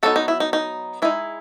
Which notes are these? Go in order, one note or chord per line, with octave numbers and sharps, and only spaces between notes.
F#3 B3 D#4 A4
D#4
E4
D#4
D#4
G#3 D#4 E4